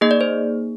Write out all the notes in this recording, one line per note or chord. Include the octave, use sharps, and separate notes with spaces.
A#3 D#4 G#4 D#5
D5
C5